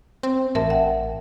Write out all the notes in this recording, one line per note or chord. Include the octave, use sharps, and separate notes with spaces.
C4
A1 A#4 E5 A5
E5 F#5 G5